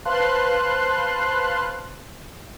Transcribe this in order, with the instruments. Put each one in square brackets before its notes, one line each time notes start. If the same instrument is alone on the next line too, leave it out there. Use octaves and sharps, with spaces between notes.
[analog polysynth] B4 C5 F5 A5 C6 F#6